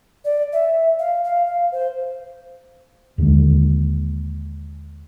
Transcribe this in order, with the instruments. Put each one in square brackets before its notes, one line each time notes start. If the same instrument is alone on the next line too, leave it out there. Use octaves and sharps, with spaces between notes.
[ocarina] D5
E5
F5
F5
F5
C5
[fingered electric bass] D#2 D3 F3 G#3